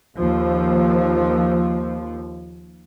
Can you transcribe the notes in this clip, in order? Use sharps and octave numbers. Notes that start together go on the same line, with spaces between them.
D#2 F3